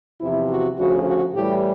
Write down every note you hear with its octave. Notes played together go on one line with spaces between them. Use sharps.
E2 C3 F3 E4
F#4
D2 C#3 F3 F#4
F#4
A2 E3 G3 G4